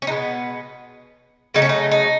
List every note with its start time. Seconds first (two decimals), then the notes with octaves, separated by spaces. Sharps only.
0.02 C#4
0.07 B2 G#3 B3 D#4
1.54 C#3 F#3 A3 D#4
1.62 C#4
1.69 D#4
1.91 D#4